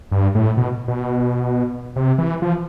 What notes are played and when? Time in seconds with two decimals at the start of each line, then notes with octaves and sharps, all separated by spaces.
0.11 G2
0.35 A2
0.57 B2
0.88 B2
1.96 C3
2.18 E3
2.42 F3